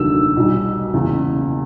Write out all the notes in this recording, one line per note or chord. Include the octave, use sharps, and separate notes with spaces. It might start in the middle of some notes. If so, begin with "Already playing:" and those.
Already playing: F1 D#2 D3 F#3 E6
B1 B2 G3
F#1 E2 C#3